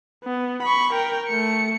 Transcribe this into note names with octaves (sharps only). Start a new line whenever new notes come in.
B3
B5 C#6
A#4 G5
A3 C#7